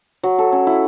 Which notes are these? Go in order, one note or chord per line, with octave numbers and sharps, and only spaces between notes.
F#3
A4
C#4
E4